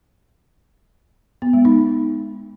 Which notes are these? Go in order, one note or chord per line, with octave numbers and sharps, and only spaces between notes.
B3
G#3
D#4